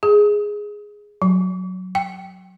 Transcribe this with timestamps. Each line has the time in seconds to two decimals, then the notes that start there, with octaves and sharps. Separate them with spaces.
0.03 G#4
1.22 F#3
1.95 G5